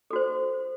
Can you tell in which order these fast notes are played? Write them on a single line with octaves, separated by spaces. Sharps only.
A4 F#4 C5